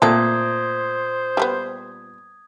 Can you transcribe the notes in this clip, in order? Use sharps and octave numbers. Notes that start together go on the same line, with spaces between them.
A#2 A3 C4 A4 C5 D#6 G#6
G3 A3 B3